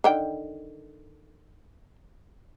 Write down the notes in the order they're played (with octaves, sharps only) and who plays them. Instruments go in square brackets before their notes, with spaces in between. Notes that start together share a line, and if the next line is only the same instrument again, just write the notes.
[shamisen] D3 D#3 G5